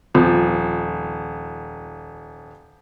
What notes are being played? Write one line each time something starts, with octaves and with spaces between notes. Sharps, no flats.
D#1 F3